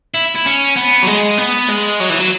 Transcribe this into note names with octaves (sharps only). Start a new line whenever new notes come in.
E4
E4
C#4
B3
F#3
G#3
B3
G#3
F#3
E3
F#3